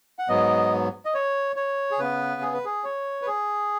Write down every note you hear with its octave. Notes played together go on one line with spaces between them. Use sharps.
F#5
G#2 F#3 B3 D#5
D#5
C#5
C#5
G#4
C#3 B3 B4
G#4
B4
G#4
C#5
B4
G#4